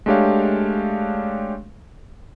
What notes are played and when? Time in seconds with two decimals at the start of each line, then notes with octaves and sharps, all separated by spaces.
0.06 G#3 A3 D4 G4 C#5 F5